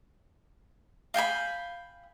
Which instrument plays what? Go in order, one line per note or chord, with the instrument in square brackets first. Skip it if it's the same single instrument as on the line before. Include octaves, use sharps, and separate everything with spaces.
[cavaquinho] F5 G5 G#5 B5